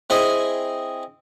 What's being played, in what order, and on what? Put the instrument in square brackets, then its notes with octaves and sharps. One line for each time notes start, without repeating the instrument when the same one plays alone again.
[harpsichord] C4 E4 G#4 D#5 G#5